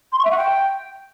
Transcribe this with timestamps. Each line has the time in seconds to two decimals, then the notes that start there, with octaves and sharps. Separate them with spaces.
0.12 C6
0.19 C#6
0.25 E5
0.31 F#5
0.37 G5